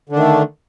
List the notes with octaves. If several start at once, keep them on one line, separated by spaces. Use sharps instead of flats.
D3 D#3 A3 D4